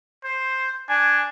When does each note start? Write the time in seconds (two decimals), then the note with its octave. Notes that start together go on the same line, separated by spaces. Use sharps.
0.24 C5
0.89 D4 G#5